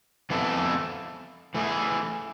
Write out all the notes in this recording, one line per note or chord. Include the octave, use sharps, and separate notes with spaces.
F2 E3 B3 E4 A4
E3 A3 E4 G#4